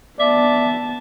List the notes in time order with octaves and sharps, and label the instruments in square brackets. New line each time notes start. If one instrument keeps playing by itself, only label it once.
[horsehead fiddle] B3 A5 [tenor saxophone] D5 [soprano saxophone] E5